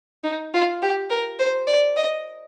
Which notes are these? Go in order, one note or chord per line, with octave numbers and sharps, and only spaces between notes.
D#4
F4
G4
A#4
C5
D5
D#5